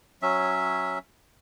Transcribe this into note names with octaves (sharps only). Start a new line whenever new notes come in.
F#3 C#4 E5